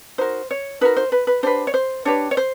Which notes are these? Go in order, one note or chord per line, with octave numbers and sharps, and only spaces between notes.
D#4 F#4 A#4 C5
C#5
D#4 F#4 A#4 B4
C5
B4
B4
D4 G4 B4 C5
C#5
C5
D4 G4 B4 C#5
C#5
C5